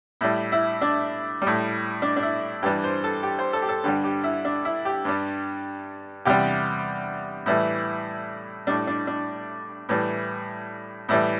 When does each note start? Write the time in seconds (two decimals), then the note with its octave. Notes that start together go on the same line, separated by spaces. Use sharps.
0.21 A2 G3 E4
0.52 E4
0.81 D4
1.42 G3
1.47 A2
2.02 D4
2.16 D4
2.22 E4
2.63 G2 E3 G3 G4
2.84 C5
3.04 A4
3.23 G4
3.39 C5
3.53 A4
3.62 G4
3.69 A4
3.84 G2 D3 G3 G4
4.04 G4
4.24 E4
4.45 D4
4.65 E4
4.85 G4
5.05 G2 G3
6.25 E2 C3 G3 G4
7.46 A2 E3 G3 E4
8.67 A2 G3 D4
8.87 D4
9.07 D4
9.89 A2 E3 G3
11.09 A2 E3 G3 E4